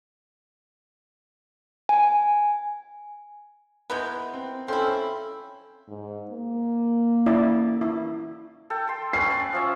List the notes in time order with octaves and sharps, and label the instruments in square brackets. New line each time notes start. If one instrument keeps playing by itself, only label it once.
[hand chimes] G#5
[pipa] E3 G#3 B3 [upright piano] A#4 G6
[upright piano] C4
[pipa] F3 E4 [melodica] C4 C#4 G5 [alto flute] A4 [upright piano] C6
[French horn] G#2
A#3
[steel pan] C#4 E4 D5
E4
[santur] A4 G5
G5 C6
[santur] C#4 B4 [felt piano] C7
[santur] D5 C#6
F3 C#4 E5